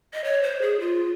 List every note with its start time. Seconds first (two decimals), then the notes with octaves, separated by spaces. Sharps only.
0.14 D#5
0.24 C#5
0.43 C5
0.62 G#4
0.80 F4